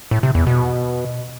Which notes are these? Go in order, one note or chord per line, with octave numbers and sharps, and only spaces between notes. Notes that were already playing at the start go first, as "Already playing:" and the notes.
A2
C3
E2
B2